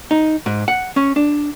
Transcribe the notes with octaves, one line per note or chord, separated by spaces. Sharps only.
D#4
G#2
F#5
C#4
D4